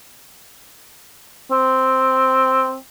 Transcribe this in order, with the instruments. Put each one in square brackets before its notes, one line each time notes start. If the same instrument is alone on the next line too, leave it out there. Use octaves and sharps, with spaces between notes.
[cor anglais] C4